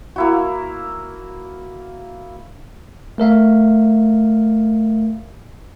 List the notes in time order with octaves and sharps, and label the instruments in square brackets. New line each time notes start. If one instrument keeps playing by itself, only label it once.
[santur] A#3 E4 F#4
[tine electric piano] A3 A#4 E5 F5